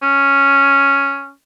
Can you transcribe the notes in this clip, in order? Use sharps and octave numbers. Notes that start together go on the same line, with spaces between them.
C#4